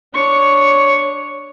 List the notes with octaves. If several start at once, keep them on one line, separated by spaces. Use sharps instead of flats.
D4 C#5 C#6